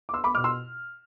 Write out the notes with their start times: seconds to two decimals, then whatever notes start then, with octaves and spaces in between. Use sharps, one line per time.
0.09 D6
0.13 B3 C6 E6
0.24 B5 D6
0.35 B2 D6 F6
0.44 C6 E6